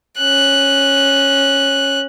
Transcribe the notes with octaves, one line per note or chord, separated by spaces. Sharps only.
C#4 F#6